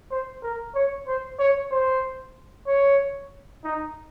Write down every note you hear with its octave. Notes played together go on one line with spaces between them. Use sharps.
C5
A#4
C#5
C5
C#5
C5
C#5
D#4